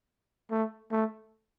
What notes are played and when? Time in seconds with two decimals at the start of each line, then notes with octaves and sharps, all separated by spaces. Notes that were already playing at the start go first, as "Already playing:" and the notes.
0.51 A3
0.92 A3